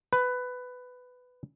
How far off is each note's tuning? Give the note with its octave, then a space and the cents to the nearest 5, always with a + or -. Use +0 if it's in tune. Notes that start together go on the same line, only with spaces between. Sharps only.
B4 +15